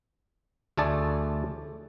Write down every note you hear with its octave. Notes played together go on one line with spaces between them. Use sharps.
D2 A3 G#4 A4 D5 A5